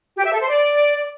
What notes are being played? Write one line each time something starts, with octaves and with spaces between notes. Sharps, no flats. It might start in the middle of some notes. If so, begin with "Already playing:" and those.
G4
E5
A4
C5
D5